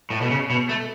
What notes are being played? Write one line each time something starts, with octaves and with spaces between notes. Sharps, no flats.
A2
B2
C#3
B2
A3